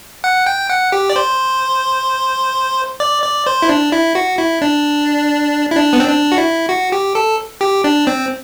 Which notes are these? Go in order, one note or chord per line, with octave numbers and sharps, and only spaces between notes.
F#5
G5
F#5
G4
D5
C5
D5
D5
C5
E4
D4
E4
F#4
E4
D4
E4
D4
B3
C4
D4
F#4
E4
F#4
G4
A4
G4
D4
C4